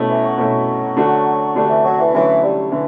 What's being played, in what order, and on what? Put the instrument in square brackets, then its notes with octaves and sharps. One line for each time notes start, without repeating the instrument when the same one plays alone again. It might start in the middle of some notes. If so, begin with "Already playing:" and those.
Already playing: [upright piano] B2 A3 C#4 E4
[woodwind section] E3
F#3
[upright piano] B2 A3 C#4 E4
D3 A3 D4 F#4
[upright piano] D3 A3 D4 F#4 [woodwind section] G3
[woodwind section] E3
F#3
E3
[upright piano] D3 F#3 A3 C#4 E4 [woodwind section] E3
[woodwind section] G3
[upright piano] D3 [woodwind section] E3